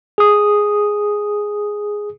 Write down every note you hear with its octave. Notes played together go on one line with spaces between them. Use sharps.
G#4 D#6